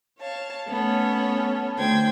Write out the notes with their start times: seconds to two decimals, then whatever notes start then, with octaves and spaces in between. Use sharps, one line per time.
0.19 C#5 F5 A5
0.67 A3 B3 C#4 A4 C#5
1.78 D2 C5 G5 G#6